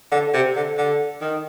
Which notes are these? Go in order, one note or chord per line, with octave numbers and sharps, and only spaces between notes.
D3
C3
D3
D3
D#3